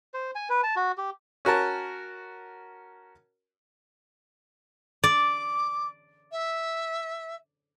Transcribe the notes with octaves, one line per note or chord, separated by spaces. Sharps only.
C5
G#5
B4
A5
F#4
G4
C#4 F#4 A#4 A5
D5 D6
E5